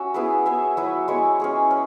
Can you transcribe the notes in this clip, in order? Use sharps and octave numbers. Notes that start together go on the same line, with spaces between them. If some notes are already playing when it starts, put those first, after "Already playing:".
Already playing: C#4 F#4 E5
B3 E4 G#4 B4
B3 G#4 E5
F#3 E4 B4 E5
G#3 B3 E4 C#5
C#4 G#4 C#5
C#4